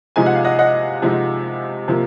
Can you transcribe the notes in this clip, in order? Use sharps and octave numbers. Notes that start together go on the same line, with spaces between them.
C3 F3 G#3 D#4 G#5
F#5
F5
D#5 F#5
D#5 F#5
C3 F3 G#3 D#4
C3 F3 A#3